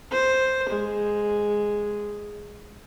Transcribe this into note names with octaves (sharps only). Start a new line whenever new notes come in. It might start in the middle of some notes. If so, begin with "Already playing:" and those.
C5
G#3